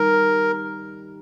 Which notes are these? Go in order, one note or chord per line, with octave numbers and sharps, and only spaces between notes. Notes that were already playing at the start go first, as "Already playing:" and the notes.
Already playing: D#3 G3 A#4